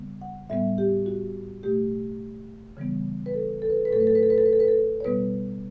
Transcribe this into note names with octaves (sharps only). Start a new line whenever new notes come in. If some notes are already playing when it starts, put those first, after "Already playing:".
Already playing: C#3 G3 B3
F#5
A2 G3 B3 E5
G4
F#4
B2 A3 G4
C#3 E3 G3 B3
B4
A4
A4
B4
A4
B4
A2 F#3 A3 A4
B4
A4
B4
A4
B4
A4
B4
A4
B4
A4
C#5
B2 G3 B3 B4